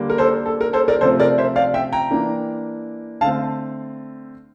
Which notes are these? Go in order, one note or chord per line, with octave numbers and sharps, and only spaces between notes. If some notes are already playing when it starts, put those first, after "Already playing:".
Already playing: D3 G3 A#3 D4
A#4
A4 C5
A4
A#4
A4 C5
A#4 D5
C3 F3 A3 C4 A4 C5
A#4 D5
C5 E5
D5 F5
E5 G5
G5 A#5
E3 A#3 D4
D3 A3 C4 F5 A5